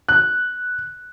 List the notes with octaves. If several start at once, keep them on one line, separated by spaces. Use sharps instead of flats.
F#6